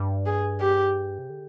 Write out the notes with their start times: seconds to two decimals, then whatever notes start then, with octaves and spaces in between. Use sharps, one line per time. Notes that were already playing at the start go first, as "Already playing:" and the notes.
Already playing: G2
0.26 G#4
0.61 G4
1.18 C3
1.30 D3